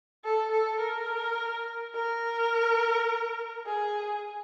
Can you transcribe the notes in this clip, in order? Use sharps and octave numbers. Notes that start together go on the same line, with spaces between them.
A4
A4
A#4
A#4
G#4